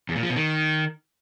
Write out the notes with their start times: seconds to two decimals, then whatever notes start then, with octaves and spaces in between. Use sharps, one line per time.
0.09 E2
0.16 A#2
0.23 F3
0.29 B2
0.36 D#3